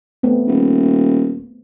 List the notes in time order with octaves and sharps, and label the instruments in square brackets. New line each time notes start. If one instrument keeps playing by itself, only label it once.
[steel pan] A3 B3 C4
[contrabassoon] D#1